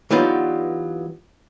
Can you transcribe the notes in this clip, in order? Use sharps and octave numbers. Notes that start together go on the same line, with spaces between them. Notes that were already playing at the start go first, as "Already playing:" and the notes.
E3 F#3 G3 B3 D#4 F4